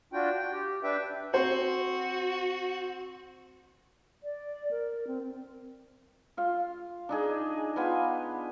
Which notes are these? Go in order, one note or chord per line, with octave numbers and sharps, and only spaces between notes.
D4 F4 F#4 G5
G5
G4
D4 B4 E5 G5
C4 F#4 C5
D5
A#4
C4
F4 F5
D4 D#4 G#4
B3 F4 B4 G#5